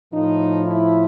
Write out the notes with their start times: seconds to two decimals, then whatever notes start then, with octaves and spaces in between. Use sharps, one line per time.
0.12 A2 F3 D#4
0.65 E4